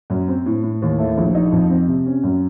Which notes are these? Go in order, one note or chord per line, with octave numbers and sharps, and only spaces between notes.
F#2
C4
A2
A2
D#2
A3
A#1
D#4
F2
C4
C3
C#4
F#2